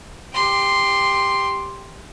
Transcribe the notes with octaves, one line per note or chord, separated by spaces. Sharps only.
G4 C6